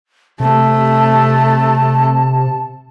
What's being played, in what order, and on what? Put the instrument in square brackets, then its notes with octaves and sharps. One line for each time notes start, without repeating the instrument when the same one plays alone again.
[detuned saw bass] C3 [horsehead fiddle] A3 [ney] A5